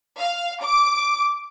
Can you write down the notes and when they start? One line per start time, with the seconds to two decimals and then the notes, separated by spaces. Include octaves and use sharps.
0.20 F5
0.63 D6